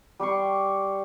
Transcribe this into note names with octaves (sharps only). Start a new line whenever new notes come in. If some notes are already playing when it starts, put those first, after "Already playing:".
G3 G4 C6 C#6